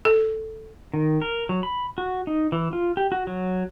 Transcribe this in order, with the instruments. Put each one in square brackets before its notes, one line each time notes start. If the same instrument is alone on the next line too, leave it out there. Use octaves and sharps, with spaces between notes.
[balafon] A4
[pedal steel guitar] D#3
A#4
F#3
B5
F#4
D#4
E3
F4
G4
F#4
F#3